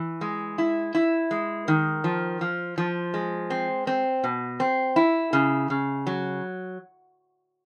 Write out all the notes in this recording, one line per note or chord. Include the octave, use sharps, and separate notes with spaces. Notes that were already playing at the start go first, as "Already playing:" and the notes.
Already playing: E3
G#3
E4
E4
G#3
D#3
F3
F3
F3
G#3
C4
C4
B2
C4
E4
C#3
C#3
F#3